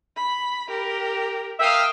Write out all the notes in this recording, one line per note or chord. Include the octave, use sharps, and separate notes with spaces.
B5
G4 A#4
A#4 E5 F5 G5 D#6